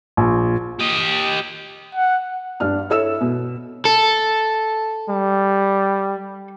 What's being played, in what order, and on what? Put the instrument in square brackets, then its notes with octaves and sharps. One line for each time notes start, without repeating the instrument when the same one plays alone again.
[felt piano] A#1
[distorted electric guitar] G4 D#5
[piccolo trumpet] F#5
[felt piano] G2 D4 F6
E4 A4 C#5 E6 E7
B2
[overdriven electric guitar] A4
[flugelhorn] G3